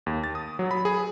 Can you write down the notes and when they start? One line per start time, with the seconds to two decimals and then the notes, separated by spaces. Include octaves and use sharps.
0.06 D#2
0.24 A6
0.35 D#6
0.59 F#3
0.71 B5
0.85 G#4